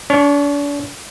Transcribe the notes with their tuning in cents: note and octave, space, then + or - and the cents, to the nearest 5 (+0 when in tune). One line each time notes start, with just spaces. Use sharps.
D4 -40 C#5 +0